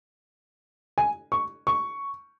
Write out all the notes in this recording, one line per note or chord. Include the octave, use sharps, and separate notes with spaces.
G#5
C#6
C#6